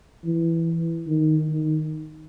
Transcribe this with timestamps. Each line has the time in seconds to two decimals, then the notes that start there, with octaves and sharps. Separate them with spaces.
0.24 E3
1.08 D#3
1.49 D#3